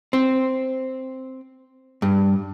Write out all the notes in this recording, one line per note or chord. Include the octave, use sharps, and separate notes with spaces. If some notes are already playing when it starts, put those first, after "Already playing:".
C4
G2